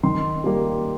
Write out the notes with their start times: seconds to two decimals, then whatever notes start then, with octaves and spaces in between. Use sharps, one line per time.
0.03 D#3 C6
0.44 G3 A#3